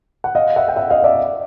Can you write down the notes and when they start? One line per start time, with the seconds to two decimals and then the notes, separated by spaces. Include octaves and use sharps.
0.24 F#5
0.35 D#5 F5
0.56 E5 F#5
0.68 G5
0.76 E5 F#5
0.90 D#5 F5
1.04 D5 E5